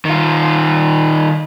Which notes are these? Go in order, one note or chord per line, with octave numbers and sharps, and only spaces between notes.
D#3 F4